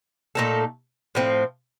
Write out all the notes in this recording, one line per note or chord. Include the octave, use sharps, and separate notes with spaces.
A#2 A3 D#4 A4
A2 F3 C4